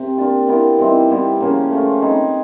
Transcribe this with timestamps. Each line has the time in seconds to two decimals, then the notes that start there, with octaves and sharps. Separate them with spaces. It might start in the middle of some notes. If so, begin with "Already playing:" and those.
Already playing: C3 C4
0.18 A#3 D4 F4
0.48 B3 E4 G4 A#4
0.79 E3 G3 C4 D#4
1.10 G3 B3 E4 G4
1.40 C#3 F3 A#3 C#4
1.71 C#3 F3 A3
2.02 C4 D#4 G#4 B4